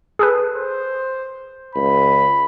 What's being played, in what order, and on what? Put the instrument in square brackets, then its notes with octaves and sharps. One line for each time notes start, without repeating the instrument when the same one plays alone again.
[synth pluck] G#4 A4 B4
[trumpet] C5
[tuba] C#2 [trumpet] B5